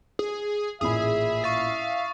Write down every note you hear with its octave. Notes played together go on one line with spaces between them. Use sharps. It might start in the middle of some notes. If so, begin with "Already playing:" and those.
G#4
A1 A#2 G#4 E5 B5 D#6
F5 C#6 A6